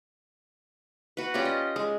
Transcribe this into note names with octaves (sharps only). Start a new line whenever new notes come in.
F#4 B4
C#4 F4 G4 D5
D#5
G#3